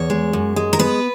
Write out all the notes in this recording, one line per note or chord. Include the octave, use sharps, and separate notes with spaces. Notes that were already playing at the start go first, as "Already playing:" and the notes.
Already playing: E2 C#5
G#3
F#2
G#3
A#4
B3 B4